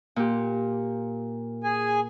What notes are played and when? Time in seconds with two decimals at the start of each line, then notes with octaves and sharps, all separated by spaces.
0.16 A#2 G4
1.64 G#4 G#5